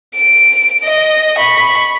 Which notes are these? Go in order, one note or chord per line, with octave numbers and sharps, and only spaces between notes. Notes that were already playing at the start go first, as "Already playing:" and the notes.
D7
D#5
B5 C#6